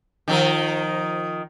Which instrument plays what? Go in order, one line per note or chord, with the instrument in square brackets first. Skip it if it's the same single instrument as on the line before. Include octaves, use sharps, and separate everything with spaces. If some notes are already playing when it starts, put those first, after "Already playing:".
[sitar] D#3 F3 A#4